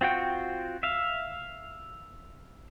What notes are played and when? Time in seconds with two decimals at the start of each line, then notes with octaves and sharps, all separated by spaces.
0.01 C4 F4 F#4 G5
0.83 E5 F5